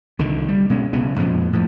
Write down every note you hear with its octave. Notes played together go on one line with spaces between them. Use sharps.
C2 D3 D#3
G3
B2 G#3 C#4
B1 C#3 B3 C#4
F2 A#2 F3 G#3
A2 F3